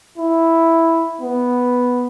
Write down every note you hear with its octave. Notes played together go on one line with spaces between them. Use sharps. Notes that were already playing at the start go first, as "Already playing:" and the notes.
E4
B3